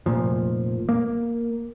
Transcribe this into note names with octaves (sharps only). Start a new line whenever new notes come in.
F1 C#2 A#2 F3
A#3